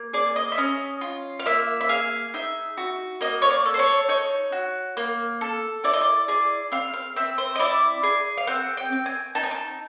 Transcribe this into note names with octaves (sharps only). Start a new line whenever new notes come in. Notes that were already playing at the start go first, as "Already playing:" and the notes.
Already playing: A#3
G#4 D5
D#5
E5
C#4 D#5
F4
F5
A#3 E5
E5
G#4 F5
D#4 E5
F#4
A#3 D#5
C#5
D5
A4
C5
C#5
D#4 C#5
F#4
A#3
A4
E4 D5
D#5
D5
G#4 D5
C4 F5
F5
C4 E5
C5
D#5
E4 D5
G#4
F5
C4 F#5
G5
C4
G#5
D#4 A5
G#5
A5